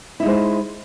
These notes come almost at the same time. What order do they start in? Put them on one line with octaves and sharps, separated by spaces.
E4 D#4 G#3 C5